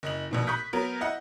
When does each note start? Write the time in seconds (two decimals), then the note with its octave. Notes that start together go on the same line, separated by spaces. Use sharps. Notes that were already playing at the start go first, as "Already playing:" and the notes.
0.03 F#1 D#5 F#7
0.31 A#1 B2 D#3
0.47 B5 C#6 D#6 F#6 G6 B6
0.73 F#3 B3 A#4
1.01 E4 D#5 F#5